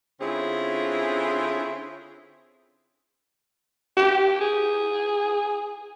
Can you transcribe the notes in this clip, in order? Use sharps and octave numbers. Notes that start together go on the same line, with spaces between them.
D3 C4 C#4 E4 F4 G#4
G4
G#4